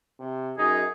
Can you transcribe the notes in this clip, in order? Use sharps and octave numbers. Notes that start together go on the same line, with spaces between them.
C3
F#2 D#4 G#4